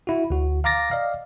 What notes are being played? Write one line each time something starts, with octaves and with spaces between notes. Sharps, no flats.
E4 F#4
D2 F#4
F5 A#5 D6 A6 A#6
D5 D#5 F5